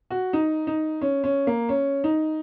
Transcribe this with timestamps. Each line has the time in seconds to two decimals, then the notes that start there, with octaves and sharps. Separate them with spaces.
0.10 F#4
0.33 D#4
0.67 D#4
1.01 C#4
1.24 C#4
1.47 A#3
1.69 C#4
2.04 D#4